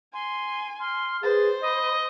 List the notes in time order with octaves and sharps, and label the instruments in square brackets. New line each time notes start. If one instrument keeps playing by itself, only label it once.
[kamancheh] G#5 [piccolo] C6
[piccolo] C6 [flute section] F6
[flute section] G#4 B4 [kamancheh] C5 [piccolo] A6
[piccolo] D#5 [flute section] B5